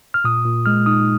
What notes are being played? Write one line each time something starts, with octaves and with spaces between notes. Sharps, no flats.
F6
A#2 D#6
A#2
G#3 F6
D#4 D#6